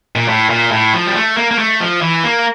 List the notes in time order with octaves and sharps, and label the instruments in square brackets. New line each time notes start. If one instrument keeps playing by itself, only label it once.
[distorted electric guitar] A#2
A2
A#2
A2
F3
G3
A3
A#3
A#3
A3
F3
E3
A#3